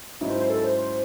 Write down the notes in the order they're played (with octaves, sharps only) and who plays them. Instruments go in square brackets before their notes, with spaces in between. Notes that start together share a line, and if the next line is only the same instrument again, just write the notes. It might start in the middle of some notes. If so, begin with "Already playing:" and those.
[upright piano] G#2 F#3 C#4 E4 [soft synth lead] D#4
[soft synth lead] C5
C5
A4
C5
C5